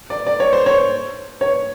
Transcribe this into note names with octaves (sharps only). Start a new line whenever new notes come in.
D5
D5
C#5
C5
C#5
C#5